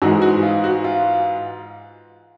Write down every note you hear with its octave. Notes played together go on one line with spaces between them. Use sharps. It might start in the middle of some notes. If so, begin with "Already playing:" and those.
G#2 E3 G#3 F#4
F#4
F4
F#4
F4